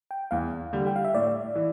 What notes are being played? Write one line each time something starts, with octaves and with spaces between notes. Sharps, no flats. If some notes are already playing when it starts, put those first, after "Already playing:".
G5
E2 F5
D3 G3
G5
F5
E5
A2 D5
E3